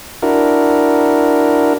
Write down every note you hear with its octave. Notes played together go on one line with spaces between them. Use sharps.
D4 E4 F#4 A#4